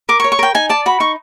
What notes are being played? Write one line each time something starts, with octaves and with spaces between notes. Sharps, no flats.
A#4 D6
C#6
C#5
C#6
A#4 G5
D#4 G#5
D5 A5
F#4 B5
D#4 C#6